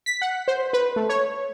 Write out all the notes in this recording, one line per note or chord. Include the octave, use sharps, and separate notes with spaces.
B6
F#5
C5
B4
A3
C#5